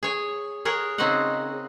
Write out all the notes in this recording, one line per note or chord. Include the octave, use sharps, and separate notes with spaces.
G#4 C#5 G#5
G#4 A#4 C#5 F#5
C#3 C4 D#4 F#4 D#5 F#5